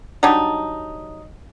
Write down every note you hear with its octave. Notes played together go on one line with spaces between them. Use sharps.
F#3 G3 D4 D#4